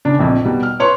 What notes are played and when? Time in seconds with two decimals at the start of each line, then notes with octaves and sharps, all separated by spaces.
0.05 C#3 D4
0.19 A#1 F2
0.44 B2 G3
0.63 F6
0.80 B4 C#5 C6 C#6